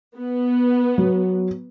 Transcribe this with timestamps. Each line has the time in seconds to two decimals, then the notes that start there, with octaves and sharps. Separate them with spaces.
0.17 B3
0.98 F#3